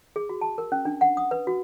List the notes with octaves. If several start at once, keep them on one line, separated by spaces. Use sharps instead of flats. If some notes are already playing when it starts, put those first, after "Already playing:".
G#4
F#4
A5
A#4
C#4
D4
F#5
D#6
B4
F#4